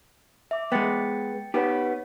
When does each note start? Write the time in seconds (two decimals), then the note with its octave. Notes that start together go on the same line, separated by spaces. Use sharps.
0.51 E5 D6
0.72 G#3 B3 G5 A6 C#7
1.54 B3 D#4 G4 B4 C#5